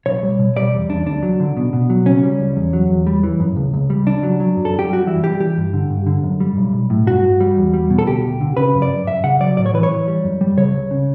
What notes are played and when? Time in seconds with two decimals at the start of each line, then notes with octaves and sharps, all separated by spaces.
0.06 B1 C#5
0.23 G3
0.39 B2
0.56 G3 D5
0.73 E2
0.89 E2 D4
1.06 D2 D4
1.23 F#3
1.40 D3
1.57 B2
1.73 B2
1.90 F#3
2.06 C#3 C#4
2.23 G3
2.40 C#2
2.57 E2
2.73 F#3
2.90 E2
3.07 G3
3.23 E3
3.40 F#2
3.56 C#2
3.74 C#2
3.90 G3
4.06 C#2 D4
4.23 F#3
4.40 F#3
4.57 F#2
4.65 A4
4.73 F#2
4.79 G4
4.90 G3 F#4
5.07 E3 E4
5.24 G3 G4
5.40 E3 G4
5.57 G2
5.73 D3
5.90 G2
6.07 D3
6.24 F#2
6.40 G3
6.57 B1
6.73 B1
6.90 A2
7.07 G2 F#4
7.24 G2
7.40 G3
7.57 E2
7.74 G3
7.90 B2
7.99 A4
8.07 D2 G4
8.24 D2
8.41 D3
8.57 C#3 B4
8.74 F#2
8.82 D5
8.91 F#2
9.07 F#2 E5
9.24 C#3 F#5
9.40 F#3 D5
9.57 A2 D5
9.66 C#5
9.74 E3 B4
9.83 C#5
9.91 E3
10.07 G3
10.24 F#2
10.41 G3
10.57 C#3 C#5
10.74 C#2
10.91 C#3